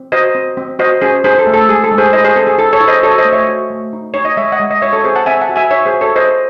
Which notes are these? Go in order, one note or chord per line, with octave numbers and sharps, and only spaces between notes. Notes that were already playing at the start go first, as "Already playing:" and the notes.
Already playing: C4
F#4 C5 D#5
C4
C4
F#4 C5 D#5
C#4 G#4 C5
D#4 G#4 C5
A4
A3
A4
G#3 G#4
A4
G#3
G#4 C5
E4 C5 D#5
G#4 C5
C4 A4
G#4
E4 A4
A4 C#5
E4
C5 D#5
F#4 A4 C#5
C5 D#5
A3
C#5 E5
F#4
A3
D#4
D#4 C#5
D#5
G#3 C#5 E5
D#5 F#5
G#3
D#5
F#4 C#5 E5
A4 C#5
C4 G#4 C5
F#5 A5
C4 E5 G#5
F#5 A5
F#4
E5 G#5
D#4 C#5 E5
G#4 C5
F#4
A4 C#5
D#4 C5 D#5